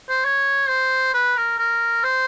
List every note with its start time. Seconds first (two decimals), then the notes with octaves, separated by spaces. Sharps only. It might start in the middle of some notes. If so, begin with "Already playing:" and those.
0.09 C5
0.24 C#5
0.69 C5
1.14 B4
1.36 A#4
1.58 A#4
2.03 C5